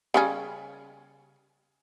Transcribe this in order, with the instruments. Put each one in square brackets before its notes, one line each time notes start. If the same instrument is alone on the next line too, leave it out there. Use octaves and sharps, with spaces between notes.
[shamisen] C#3 G3 C#4